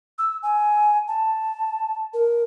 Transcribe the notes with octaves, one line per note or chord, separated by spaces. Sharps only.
E6
G#5
A5
A#4